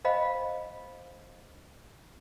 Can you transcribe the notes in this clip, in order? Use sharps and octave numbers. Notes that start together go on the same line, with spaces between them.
C5 D#5 F5 G5 B5